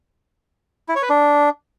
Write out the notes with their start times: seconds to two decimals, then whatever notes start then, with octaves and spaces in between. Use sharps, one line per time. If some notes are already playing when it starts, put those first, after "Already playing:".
0.89 E4
0.96 C#5
1.03 B4
1.09 D4